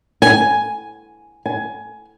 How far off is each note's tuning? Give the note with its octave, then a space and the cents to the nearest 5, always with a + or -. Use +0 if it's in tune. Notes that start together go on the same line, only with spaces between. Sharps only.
G#5 +5
G#5 +15